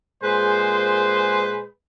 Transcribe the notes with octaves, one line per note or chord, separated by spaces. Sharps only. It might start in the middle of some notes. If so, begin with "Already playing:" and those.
A#2 G#3 G#4 B4 C5